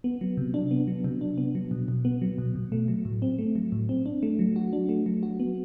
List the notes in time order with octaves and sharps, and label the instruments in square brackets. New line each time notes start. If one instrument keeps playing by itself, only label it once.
[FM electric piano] B3
F#3
C3
D4
B3
F#3
C3
D4
B3
F#3
B2
B2
B3
F#3
B2
B2
A3
F#3
A2
C4
A3
F#3
A2
C4
D4
A3
F#3
F#4
D4
A3
F#3
F#4
B3